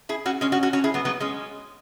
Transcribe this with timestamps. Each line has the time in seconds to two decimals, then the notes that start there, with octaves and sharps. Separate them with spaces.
0.09 E4 G#4
0.26 C#4 F#4
0.41 G#3 C#4
0.52 C#4 F#4
0.63 C#4 F#4
0.73 C#4 F#4
0.84 E4 G#4
0.94 F#3 B3
1.05 F#3 B3
1.20 G#3 C#4